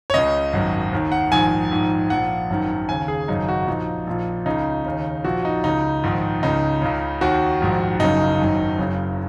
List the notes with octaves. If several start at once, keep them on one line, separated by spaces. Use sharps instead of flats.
C#5
C#2 C#3 D#5
G#1 F#2 D#3
D#2 D#3
F#5
A#1 G#2 D#3 G#5
A#1 G#2 D#3
A#1 A#2 F#5
G#1 F#2 D#3
D#2 C#3 G#5
G#4
G#1 F#2 C#3 D#4
F#4
A#1 A#2 D#4
A#1 A#2
C#2 C#3 D#4
D#2 C#3
A#1 A#2 F#4
D#4
C#2 C#3 D#4
A#1 G#2 D#3
C#2 C#3 D#4
C#2 C#3
D#2 D#3 F#4
A#1 G#2 D#3
F#1 F#2 C#3 D#4
G#1 F#2 D#3
F#1 F#2 C#3